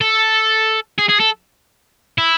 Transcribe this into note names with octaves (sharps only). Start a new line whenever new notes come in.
A4
G#4
G#4
A4
E4